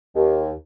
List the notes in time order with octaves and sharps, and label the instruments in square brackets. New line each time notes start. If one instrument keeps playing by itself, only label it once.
[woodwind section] D#2